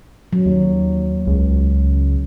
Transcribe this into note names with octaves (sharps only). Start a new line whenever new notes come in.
F#3
D#2
C#2